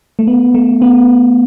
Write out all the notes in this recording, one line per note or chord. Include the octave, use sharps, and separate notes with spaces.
A3
B3
A3
B3